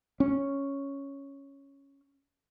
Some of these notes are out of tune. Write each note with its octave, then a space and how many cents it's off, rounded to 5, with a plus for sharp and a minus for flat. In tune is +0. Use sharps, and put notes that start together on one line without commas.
C#4 +0